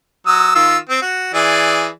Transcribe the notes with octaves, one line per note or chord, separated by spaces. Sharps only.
F#3 D#6 E6
D#3 F4 E6
C4
F#4
E3 G#4 D5